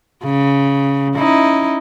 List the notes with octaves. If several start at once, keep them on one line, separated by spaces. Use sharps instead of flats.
C#3
C#4 D#4 E4